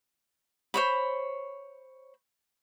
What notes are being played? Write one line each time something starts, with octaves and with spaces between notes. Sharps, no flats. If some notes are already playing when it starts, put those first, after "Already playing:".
C5 C#5 B5